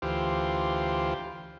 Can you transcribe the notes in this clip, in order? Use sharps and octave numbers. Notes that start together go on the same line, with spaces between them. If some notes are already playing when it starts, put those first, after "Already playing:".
D2 E3 F4 G4 C5